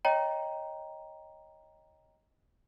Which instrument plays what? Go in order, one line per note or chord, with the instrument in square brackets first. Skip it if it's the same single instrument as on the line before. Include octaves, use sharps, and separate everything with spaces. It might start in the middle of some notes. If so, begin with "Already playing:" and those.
[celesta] C#5 D#5 G5 A#5